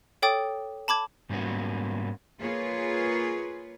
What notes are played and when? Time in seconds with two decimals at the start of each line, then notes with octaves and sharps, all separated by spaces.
0.22 A4 C#5 G5 D6 D#6 A6
0.88 A5 B5 D6 G#6
1.30 G#2 G3 A#3 B3 C#4 F#4
2.41 A#3 F4 G#4 B4 C#5